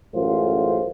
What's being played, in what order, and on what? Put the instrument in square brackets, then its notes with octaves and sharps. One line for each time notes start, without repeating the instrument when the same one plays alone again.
[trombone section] A1 F#2 G#3 F4 C5